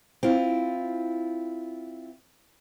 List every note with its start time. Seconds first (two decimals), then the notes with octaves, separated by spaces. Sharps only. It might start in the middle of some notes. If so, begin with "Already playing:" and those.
0.23 C4 E4 F4